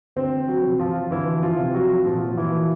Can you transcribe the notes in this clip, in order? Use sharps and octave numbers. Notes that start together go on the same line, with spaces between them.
D2 C4 C5
F#3 F#4
C3 F3
F3 F4
D2 E3 E4
F3 F4
C3 F3
F#3 F#4
A#2 F3 F4
E3 E4
F#3 A#3